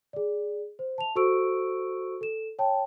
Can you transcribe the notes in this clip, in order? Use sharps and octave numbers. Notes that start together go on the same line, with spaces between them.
G#4 D5
C5
A5 F7
F#4 A4 C5 C#6 E6 D7
A4 E7
C#5 G5 A5